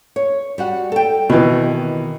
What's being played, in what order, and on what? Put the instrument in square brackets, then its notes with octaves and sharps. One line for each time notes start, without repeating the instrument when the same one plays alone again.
[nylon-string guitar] C#5
G3 F#4 F#5
A4 G5
[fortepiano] B2 E3 [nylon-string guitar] D#3